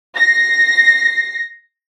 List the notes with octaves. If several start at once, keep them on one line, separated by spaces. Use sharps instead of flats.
A#6 C7